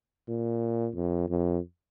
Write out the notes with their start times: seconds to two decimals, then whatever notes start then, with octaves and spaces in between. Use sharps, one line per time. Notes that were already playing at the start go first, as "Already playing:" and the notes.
0.28 A#2
0.95 F2
1.29 F2